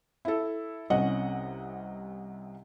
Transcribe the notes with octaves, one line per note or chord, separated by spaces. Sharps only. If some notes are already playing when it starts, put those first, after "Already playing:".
E4 A4
C2 C3 C#4 D#5 F#5